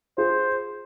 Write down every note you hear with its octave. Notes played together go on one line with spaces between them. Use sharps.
F4 G#4 C5